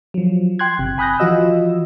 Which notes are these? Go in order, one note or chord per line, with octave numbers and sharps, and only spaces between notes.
F3 F#3
G5 C6 F#6 G#6
G1 C3
G#5 B5 D#6 F#6 G6 A#6
E3 F3 F4 F#4 D#5 E6